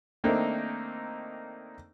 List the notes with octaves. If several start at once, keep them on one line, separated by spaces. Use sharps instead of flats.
D#3 A3 A#3 C4 D4 D#4